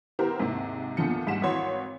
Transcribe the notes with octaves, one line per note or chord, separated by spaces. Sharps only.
B3 E4 G4 A#4 C5
D#2 G#2 C3
E2 A#2 D3 F3 C#7
D#2 G#2 G3 F#5 B6 E7
G#1 E3 F#4 C#5 C6